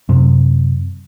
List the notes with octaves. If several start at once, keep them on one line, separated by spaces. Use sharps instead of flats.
F#2 C3